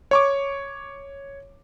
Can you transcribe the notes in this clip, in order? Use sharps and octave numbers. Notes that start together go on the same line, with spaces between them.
C#5 C#6 D6